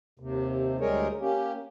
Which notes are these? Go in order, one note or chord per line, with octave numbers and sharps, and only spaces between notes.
D#2 C3
D2 G3 G#3 G#4 A#4 C#5
A#3 C#4 G4